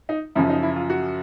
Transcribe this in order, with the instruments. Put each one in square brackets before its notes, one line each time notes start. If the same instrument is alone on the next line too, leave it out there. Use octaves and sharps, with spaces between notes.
[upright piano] D#4
F#2 C#3 F3 E4
D#4
E4
F4
F#4